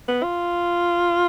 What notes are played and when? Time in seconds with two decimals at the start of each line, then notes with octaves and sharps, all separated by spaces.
0.08 B3
0.23 F4